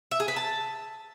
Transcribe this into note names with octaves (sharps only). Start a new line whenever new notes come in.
E5
G#4
B4
A5